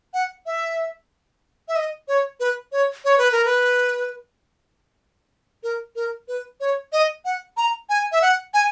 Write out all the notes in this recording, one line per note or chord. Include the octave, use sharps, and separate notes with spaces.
F#5
E5
E5
D#5
C#5
B4
C#5
C#5
B4
A#4
B4
A#4
A#4
B4
C#5
D#5
F#5
A#5
G#5
E5
F#5
G#5